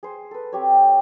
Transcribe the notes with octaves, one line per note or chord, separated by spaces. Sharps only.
G#4 C5
A4 B4
C4 G4 C#5